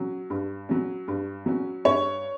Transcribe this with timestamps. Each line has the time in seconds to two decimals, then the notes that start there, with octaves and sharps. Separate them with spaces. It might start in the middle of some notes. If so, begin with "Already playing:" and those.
Already playing: F#3 C#4
0.30 G2
0.69 F#3 C#4
1.08 G2
1.46 F#3 C#4
1.85 G2 C#5